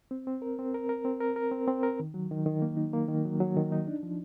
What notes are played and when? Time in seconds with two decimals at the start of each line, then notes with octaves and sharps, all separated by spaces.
0.11 C4
0.27 C4
0.42 A#4
0.59 C4
0.74 A#4
0.89 A#4
1.05 C4
1.20 A#4
1.36 A#4
1.52 C4
1.68 C4
1.83 A#4
2.00 D#3
2.14 F#3
2.31 D#3
2.46 D#3
2.62 A#3
2.77 D#4
2.93 A#3
3.09 D#3
3.25 F#3
3.40 F#3
3.56 D#3
3.72 D#4
3.87 D4
4.03 F3